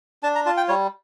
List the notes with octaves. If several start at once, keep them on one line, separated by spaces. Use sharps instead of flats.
D4 A5
A#5
F4 A5
G5
G3 C#5